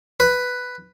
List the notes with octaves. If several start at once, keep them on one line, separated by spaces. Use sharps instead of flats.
B4